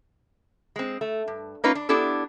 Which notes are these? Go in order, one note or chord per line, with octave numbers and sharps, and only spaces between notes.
G#3 C4
A3
G2
A#3 C#4 D#4 F4 B4
D4
B3 D4 E4 G4 A4